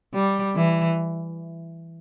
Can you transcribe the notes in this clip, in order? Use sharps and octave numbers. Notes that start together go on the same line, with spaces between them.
G3
E3